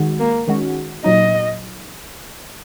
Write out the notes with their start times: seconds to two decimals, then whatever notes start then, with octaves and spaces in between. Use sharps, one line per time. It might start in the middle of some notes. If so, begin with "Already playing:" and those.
Already playing: D#3 G#3 F#4
0.19 A#3
0.48 D#3 G#3 C#4 F#4
1.04 A#2 F#3 D#4 D#5